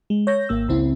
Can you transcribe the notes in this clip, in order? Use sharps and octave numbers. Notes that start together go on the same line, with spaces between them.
G#3
C#5 G6 A#6
G#1 A#3 E6
C#2 C#3 C4 E4